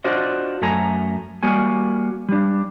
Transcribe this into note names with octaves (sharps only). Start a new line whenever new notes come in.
D4 F4 F#4 C5 D5 D#5
F#2 A3 A4 G#5 A#5
G3 A#3 F#4 G#5
G3 D4